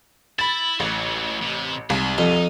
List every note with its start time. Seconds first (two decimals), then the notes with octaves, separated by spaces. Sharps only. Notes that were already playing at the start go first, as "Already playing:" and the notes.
0.39 E4 B5 A6
0.80 A1 E3 F#3
1.42 C3
1.90 C2 G#2
2.18 F2 D#4